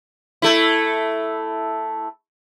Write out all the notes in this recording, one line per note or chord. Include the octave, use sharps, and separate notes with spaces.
A3 E4